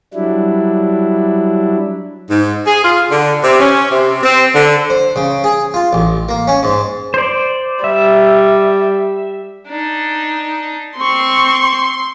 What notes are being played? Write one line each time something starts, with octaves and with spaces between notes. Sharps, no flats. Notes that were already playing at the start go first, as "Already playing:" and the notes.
F#3 G3 D4 E4
G#2
G#4
F4
D3
C3
C#4
C3
C4
D3
C5
C#3
G#4
F4
A1
A#3
C#4
G#2
C5 D5
G3 E5
D4 D#4
C4 C6 C#6